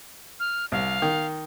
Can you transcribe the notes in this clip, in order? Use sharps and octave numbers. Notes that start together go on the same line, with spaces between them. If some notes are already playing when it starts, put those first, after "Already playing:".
F6
C2 F5
D#3